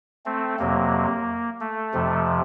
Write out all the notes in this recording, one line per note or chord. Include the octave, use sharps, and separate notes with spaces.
A3 C4
F2 C3 F#3 A#3
A3
F2 C3 F3